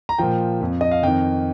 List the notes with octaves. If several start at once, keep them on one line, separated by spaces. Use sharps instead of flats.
A#5
A#2 F3 G5
F2 F3
D#5
F5
F2 D#3 G5